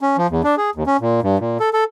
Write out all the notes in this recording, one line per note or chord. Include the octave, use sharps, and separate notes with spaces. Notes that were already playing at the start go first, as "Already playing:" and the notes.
C#4
F3
E2
D4
G#4
D#2
C#4
A#2
G2
A#2
A4
A4